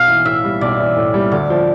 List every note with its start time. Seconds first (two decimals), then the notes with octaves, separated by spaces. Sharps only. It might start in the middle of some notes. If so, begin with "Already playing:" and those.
Already playing: B1 F5
0.08 E3
0.25 A2 E5
0.44 G3
0.61 B1 D5
0.79 E3
0.96 A2
1.14 G3
1.32 D2 D5
1.50 F3